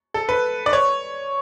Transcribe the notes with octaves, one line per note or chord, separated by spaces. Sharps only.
A4
B4
D5
C#5